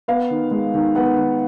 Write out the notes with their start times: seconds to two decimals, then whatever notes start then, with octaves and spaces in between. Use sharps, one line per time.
0.08 B3 F5
0.30 D#3
0.51 G#3
0.74 D#3
0.95 B3 F#5
1.18 D#3